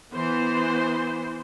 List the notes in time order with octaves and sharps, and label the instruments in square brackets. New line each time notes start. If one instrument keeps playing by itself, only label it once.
[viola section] E3 B3 C5